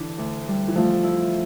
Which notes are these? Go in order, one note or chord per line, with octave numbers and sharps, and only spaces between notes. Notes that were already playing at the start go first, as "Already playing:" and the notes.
Already playing: D3 E3 D4
D2
G3
E3
F3 A3
E4